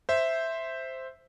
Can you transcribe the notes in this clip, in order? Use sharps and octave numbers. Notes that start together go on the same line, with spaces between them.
C5 E5